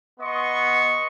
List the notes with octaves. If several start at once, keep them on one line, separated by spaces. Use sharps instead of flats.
B3 D#5 C6 C#6